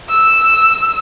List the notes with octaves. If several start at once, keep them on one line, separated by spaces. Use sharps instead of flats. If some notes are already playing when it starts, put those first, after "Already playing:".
E6